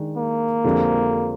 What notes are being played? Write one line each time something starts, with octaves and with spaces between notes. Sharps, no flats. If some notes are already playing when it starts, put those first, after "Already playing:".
Already playing: D#3 G#3 D4
A#3
F2 D3 G#3 C4 G4